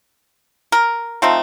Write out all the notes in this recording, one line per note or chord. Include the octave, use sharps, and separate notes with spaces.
A#4
F3 A3 C4 D#4